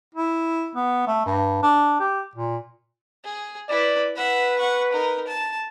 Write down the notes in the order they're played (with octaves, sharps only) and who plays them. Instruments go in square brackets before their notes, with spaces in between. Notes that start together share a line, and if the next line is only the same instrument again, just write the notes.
[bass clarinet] E4
B3
A3
G2
D4
G4
A#2
[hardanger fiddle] G#4
[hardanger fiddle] E4 B4 [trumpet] D5
[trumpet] B4 [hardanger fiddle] E5 F#5
[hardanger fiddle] F#5 C#6
D#4 A#4
A5